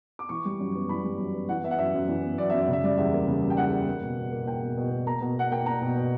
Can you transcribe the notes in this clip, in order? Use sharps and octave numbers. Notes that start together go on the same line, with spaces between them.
D6
E3 C#6
G3
F#2
B3
E3 B5
G3
F#2
B3
E3 F#5
B3 E5
F#5
F#2 E5
F#2
E3
B3
F#2 D5
F#2 E5
D5
C#3 E5
G3 D5
E2 E5
A#3
C#3
G3
G5
E2 F#5
A#3
A#3
B2
B2
A#3
A#3 G5
B2
B2
A#3
A#3 A#5
B2
B2 F#5
A#3 G5
A#3 A#5
B2
B2